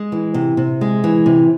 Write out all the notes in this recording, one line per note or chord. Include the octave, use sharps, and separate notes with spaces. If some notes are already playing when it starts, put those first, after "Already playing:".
Already playing: G#3
E3
C3
C3
G#3
E3
C3